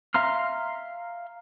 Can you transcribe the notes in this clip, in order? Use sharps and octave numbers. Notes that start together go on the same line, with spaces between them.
E5 F5 A#5 C6 F6